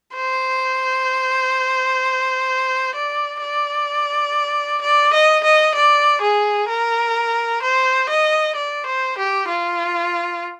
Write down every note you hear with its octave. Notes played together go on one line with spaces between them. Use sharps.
C5
D5
D5
D5
D#5
D#5
D5
G#4
A#4
C5
D#5
D5
C5
G4
F4